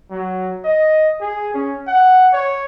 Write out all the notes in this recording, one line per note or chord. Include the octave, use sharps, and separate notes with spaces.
F#3
D#5
G#4
C#4
F#5
C#5